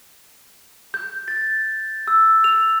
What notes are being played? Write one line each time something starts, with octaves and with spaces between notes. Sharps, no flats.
G6
A6
E6
F7